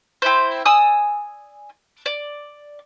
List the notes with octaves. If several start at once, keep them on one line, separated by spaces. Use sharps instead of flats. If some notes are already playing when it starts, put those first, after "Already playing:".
C4 E4 C5
D5 G#5 D#6 E6
D5